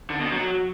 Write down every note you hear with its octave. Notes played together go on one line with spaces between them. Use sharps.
D3
B2
F#3